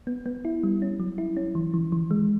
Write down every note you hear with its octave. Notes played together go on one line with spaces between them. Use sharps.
B3
B3
E4
G3
C#4
F#3
E4
C#4
E3
E3
E3
G#3